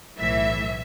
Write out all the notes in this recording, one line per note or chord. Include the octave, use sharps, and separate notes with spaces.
B1 A2 E3 E5